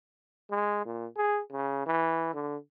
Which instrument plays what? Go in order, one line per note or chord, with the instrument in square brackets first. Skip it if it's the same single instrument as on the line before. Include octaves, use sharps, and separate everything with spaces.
[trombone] G#3
A#2
G#4
C#3
E3
D3